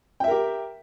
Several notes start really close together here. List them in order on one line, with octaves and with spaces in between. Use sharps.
G5 E5 A#4 G4